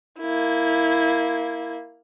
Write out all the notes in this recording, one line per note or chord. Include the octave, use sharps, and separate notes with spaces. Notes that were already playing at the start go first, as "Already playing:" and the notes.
A#3 E4